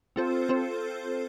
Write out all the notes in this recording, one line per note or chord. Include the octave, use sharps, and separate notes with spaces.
C4 F4 A4 C5
C4 F4 A4 C5